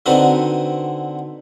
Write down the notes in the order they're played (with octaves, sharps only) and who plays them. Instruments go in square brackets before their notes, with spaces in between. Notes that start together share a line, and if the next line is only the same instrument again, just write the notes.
[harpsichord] D3 C4 D#4 F#4 B4